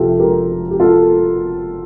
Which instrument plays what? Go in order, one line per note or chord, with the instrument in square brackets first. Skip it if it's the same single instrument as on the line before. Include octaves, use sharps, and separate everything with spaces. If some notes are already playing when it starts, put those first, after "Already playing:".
Already playing: [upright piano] F1 F4 G4 A4 E5 G5
G4 A#4
G4
F4 A4